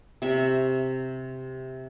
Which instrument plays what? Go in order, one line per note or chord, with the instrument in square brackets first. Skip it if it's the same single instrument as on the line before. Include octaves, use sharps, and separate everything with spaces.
[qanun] C3 E5 C#6